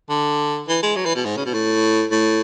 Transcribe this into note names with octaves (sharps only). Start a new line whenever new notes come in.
D3
E3
G#3
F#3
E3
B2
G#2
C#3
B2
A2
A2